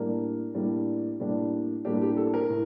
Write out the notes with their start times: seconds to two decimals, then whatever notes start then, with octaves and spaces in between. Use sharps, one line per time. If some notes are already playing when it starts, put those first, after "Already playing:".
Already playing: A2 G3 A#3 D4 A#4
0.55 A2 G3 A#3 D4
1.20 A2 G3 A#3 D4
1.85 A2 G3 A#3 D4 G4
2.02 G4
2.17 A4
2.34 A#4
2.49 A2